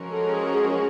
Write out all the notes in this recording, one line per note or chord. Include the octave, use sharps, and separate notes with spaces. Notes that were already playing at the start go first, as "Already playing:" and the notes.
Already playing: F3 G#3 C#4 F#4 A#4
A4
G#4
G#4